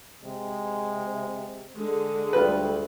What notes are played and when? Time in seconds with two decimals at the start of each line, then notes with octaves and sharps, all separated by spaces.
0.24 C3 G#3
1.75 D3 G#3
2.33 D2 G3 F4 B4